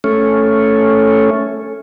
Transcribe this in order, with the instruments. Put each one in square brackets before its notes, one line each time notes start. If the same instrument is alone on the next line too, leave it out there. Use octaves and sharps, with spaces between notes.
[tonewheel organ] A3 C#4